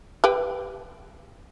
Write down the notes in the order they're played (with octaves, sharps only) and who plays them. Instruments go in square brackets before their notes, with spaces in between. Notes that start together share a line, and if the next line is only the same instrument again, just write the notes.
[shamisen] G4 B4 G5